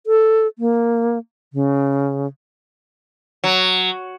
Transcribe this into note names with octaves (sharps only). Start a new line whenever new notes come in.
A4
A#3
C#3
F#3